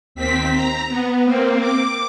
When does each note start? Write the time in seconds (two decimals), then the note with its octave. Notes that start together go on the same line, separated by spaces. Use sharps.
0.15 D#2 C4 B6
0.53 A#5
0.89 B3
1.25 A#3 C4
1.60 D6